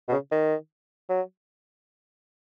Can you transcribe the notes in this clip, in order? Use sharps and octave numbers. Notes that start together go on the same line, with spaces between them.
B2
C#3
D#3
F#3